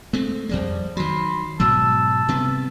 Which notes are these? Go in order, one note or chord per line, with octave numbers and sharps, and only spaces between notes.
G#3 A3 C4
F2 F3 G3 G#3 D5
D#3 F#3 B5 C6
G#2 B2 F#3 A5 E6
C3 G3 B3